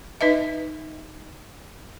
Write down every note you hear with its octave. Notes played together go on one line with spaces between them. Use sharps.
D#4 B4 D#5 E5